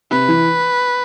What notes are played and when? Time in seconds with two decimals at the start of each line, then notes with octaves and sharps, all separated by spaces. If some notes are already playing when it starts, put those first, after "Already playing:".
0.11 C3 B4
0.28 E3